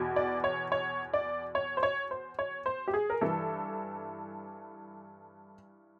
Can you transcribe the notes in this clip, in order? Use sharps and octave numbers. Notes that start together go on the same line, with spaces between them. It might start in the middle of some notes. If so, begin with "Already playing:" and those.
Already playing: E2 B2
D5
C#5
C#5
D5
C#5
C5
C#5
C5
C#5
C5
G4
G#4
A#4
G2 E3 A4